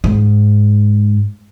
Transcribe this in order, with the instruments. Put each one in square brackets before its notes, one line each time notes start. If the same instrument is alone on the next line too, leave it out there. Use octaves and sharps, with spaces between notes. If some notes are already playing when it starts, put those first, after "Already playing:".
[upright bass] G#2